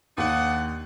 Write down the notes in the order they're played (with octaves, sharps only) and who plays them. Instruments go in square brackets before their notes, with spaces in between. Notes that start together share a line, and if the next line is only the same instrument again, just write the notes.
[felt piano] D#2 [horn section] D4 D#4 F#5